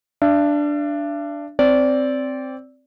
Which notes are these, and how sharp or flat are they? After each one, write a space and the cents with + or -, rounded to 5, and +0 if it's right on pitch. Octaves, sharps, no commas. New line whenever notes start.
D4 +0 E5 +45
C4 +0 D5 -20